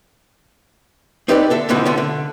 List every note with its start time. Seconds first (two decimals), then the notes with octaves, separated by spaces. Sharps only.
1.28 C4 D#4 G4 B4 C5 D5
1.50 D3 A4 E5
1.69 G#2 B2 D3 E3 F3 C4
1.85 D3 A3 B3 F4
1.98 D3